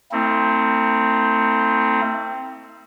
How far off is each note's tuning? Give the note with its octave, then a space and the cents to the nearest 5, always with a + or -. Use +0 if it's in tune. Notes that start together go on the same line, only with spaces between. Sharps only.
A3 +40 C4 +0 E4 -45